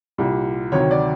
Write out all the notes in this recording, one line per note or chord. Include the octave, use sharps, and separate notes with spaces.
C2 A#2 G3
D2 C3 D#3 F#3 C#5
D5